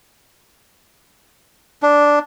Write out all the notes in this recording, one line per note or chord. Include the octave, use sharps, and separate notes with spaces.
D4